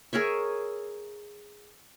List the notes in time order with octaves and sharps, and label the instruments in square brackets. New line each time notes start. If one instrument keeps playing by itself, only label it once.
[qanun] G#4 A#4 C#5 E5